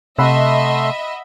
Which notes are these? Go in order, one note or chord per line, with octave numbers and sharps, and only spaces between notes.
C3 A3 D#5 E5 F#5 B5 C6 E6